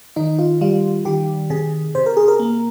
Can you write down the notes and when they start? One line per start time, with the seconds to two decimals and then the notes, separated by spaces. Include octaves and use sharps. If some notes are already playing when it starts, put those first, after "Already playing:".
0.16 D#3 D#4
0.39 F4
0.61 G3 F4
1.05 D#3 G4
1.50 C3 G#4
1.95 C3 C5
2.06 A#4
2.17 G#4
2.28 A#4
2.40 A#3